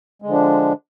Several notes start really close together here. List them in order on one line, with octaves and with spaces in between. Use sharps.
G#3 D3 F3 D4